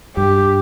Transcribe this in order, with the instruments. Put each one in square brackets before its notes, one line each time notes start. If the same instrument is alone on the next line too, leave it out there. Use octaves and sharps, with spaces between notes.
[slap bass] G2 [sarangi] G4